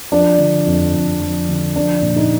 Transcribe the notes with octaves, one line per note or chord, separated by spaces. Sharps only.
F3 D4
D3
F2
F2
F3
D3
F3 D4
A#2
D#4